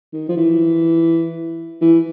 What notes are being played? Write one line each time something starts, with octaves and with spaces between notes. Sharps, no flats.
D#3
F3
E3
E3